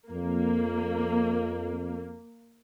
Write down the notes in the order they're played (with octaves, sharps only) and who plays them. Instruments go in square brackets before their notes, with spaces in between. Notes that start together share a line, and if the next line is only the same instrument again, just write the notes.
[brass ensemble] F2 [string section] A#3